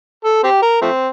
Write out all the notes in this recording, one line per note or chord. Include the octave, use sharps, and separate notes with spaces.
A4
C4 G4
A#4
F3 A3 C4